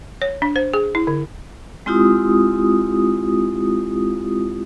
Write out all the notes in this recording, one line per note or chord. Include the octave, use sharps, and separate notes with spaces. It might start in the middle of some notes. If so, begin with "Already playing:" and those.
C#5
D4
C5
G#4
E4
D3
G#3 C4 E4 F4 G4 D#6